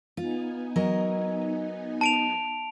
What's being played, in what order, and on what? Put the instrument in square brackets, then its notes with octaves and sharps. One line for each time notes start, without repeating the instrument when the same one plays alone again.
[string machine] B3 D#4 G#5 [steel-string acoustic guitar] F4
[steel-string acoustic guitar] F#3 A#4 D#5
[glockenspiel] A5 D7 F7